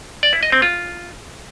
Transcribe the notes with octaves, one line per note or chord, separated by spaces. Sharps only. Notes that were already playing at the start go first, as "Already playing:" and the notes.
D5
E4
D#5
C4
F4